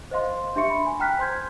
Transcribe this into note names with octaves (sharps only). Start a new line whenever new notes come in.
C5 D#5 F5 C6
D4 G4 E5 C6 C#6 C#7
B5
G#5
G5 A#5 F6 F#6 B6
C5 C6 G6 G#6